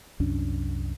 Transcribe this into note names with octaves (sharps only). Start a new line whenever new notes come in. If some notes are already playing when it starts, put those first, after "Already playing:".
C2 F#2 C#4 D4